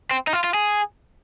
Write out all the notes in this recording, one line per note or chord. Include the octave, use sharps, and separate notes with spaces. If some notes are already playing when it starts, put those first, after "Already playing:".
C4
D#4
F4
F4
G#4